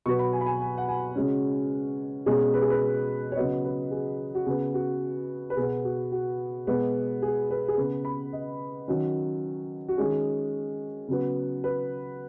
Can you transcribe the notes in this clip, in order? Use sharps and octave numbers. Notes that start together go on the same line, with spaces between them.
B2 F#3 B3 C#6
B5
G#5
B5
G#5
G#5
F#5
G#5
C#3 G#3 C#4 F#4
B2 G#3 C#4 G#4
B4
G#4
B4
C#5
C#3 F#3 B3 D#5
B4
G#4
F#4
C#3 B3 G#4
F#4
B4
B2 B3 G#4
F#4
F#4
B2 G#3 B3
G#4
B4
G#4
C#3 B3 B4
B5
D#5
D#3 F#3 C#4
F#4
D#3 G#3 C#4 G#4
C#3 F#3 B3
B4